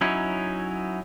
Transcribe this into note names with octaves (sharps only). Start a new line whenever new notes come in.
F#3 C#4 D#4 E4